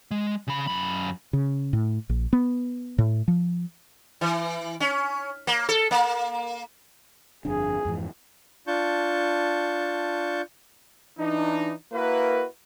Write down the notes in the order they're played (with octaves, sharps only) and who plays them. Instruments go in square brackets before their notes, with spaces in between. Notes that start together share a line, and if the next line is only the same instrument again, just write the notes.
[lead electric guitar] G#3
C#3 B5
F#2 B5
[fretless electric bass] C#3
A2
A#1
B3
A2
F3
[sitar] E3
C#4
A#3
A4
A#3
[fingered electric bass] G1 F2 D4 [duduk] G#4
[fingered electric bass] F2 G#2 E3
[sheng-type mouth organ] D4 F4 A5 C#6 G6
[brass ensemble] E3 D4 D#4
A#3 E4 F#4 A#4 B4